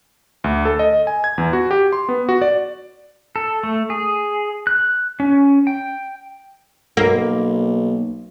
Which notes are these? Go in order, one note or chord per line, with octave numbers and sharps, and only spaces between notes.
D2
A4
D#5
G#5
G#6
E2
F#4
G4
C6
B3
F#4
D5
A4
A3
G#4
F#6
C#4
G5
B1 A#3